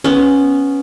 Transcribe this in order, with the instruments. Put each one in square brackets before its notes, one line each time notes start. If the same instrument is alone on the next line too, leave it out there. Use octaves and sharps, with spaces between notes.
[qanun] B3 C#4